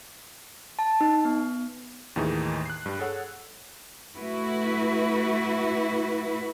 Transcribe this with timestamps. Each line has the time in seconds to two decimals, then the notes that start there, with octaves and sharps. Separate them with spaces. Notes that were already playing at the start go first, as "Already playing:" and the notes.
0.79 A5
1.01 D#4
1.25 B3
2.16 D#2 A2 D#3 E3 D#4 G#4
2.66 F#6 C7
2.86 G2 G3
2.99 G#4 A4 C#5 F#5 E6 F#6
4.15 A3 E4 F#4 B4